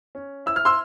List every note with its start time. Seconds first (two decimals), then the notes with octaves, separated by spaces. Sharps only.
0.15 C#4
0.46 E4 E6
0.56 F6
0.65 C6 E6